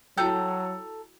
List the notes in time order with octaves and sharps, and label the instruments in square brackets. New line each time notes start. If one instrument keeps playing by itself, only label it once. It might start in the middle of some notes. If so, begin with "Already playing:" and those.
[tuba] F#3 [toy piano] E4 F#4 G5 [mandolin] A4 A#5 G6